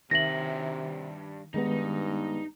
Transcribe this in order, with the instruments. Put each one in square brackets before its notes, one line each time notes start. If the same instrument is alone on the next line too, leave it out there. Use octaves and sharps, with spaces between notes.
[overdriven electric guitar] G2 E5 [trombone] C3 [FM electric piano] D#3 [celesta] A#6 F#7
[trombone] G2 [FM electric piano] D#3 G#3 B3 [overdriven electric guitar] D#4